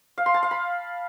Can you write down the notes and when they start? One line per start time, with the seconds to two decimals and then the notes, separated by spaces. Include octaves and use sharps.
0.18 F5
0.26 C6
0.34 A5
0.43 F5
0.51 B5